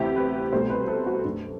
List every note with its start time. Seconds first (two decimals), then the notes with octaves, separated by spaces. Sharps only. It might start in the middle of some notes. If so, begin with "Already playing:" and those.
Already playing: D2 C3 E3 B3 E4 G4
0.16 B4
0.52 C2 B2 A3 C5
0.70 B4
0.88 A4
1.07 F#4
1.24 F#2 F#3 A3 D4